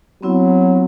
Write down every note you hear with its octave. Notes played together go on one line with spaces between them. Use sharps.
F#3 B3 C4 E4